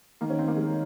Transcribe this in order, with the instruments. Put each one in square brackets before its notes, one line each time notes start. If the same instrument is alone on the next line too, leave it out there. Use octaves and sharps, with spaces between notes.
[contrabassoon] D#3 [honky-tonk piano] A#3
[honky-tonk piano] C#4
C4
A#3
G#3